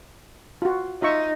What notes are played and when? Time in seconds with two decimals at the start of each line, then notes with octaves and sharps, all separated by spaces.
0.62 F4 F#4
1.02 D#4 F4 E5 C#6